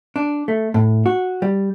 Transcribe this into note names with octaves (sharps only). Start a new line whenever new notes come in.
D4
A3
A2
F#4
G3